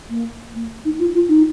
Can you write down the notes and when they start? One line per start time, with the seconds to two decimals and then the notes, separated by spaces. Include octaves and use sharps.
0.09 A#3
0.54 A#3
0.85 D#4
0.99 F4
1.14 F4
1.28 D#4